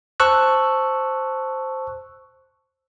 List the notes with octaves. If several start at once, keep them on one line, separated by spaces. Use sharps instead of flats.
C5 A5 C#6 E6 F#6